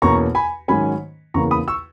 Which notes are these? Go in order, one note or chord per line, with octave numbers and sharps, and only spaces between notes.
E2 B2 A#3 C#4 A#5 C#6
G#5 B5
G#2 D#3 F#3 C#4 G#5 B5
E2 C#3 E3 A#3 A#5 C#6
B5 D#6
C#6 E6